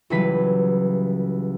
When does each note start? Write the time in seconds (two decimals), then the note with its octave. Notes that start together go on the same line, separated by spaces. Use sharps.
0.10 C#2 E3 F#3 G3 B4 B6